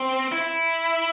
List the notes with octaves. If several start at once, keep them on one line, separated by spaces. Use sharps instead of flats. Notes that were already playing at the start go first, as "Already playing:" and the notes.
Already playing: C4
E4